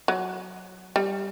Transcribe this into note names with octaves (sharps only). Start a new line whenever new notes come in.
F#3
G3